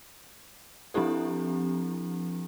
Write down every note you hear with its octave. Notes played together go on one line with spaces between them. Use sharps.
F3 C4 D4 E4 G4 A4